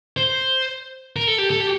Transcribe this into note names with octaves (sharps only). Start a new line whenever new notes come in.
C5
A#4
A4
G4
A4
G4